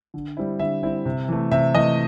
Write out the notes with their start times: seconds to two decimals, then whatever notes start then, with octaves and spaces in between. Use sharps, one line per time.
0.14 D3
0.37 G3 C4 E4
0.59 D3 E5
0.83 G3 C4 E4
1.05 C3
1.28 E3 A3
1.51 C3 E5
1.74 E3 A3 D#5